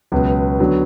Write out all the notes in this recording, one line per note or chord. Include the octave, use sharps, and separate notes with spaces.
C#2 B2 F#3 B3
D3 F#3 B3